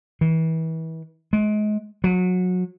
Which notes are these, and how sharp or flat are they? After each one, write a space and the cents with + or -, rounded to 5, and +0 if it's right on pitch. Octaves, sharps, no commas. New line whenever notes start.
E3 -35
G#3 +30
F#3 -25